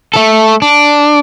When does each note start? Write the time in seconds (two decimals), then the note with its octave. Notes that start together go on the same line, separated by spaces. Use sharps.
0.14 A3 A4
0.62 D4